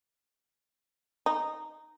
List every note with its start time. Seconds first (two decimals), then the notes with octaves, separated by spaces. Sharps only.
1.26 D#4